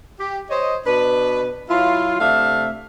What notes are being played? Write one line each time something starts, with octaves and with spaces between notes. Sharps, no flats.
G4
C5 C#5 D#5
B2 D4 B4
F#3 E4 F4
C3 A3 D4 E5 F5